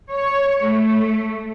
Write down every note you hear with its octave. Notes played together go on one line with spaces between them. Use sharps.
C#5
A3